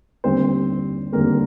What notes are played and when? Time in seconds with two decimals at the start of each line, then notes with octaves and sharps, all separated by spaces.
0.24 D#2 D3 G3 C4 C5
1.13 D#2 D3 G3 A#3 C4 A#4